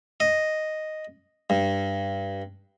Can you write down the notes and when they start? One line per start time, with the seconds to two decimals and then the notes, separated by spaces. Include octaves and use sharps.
0.20 D#5
1.50 G2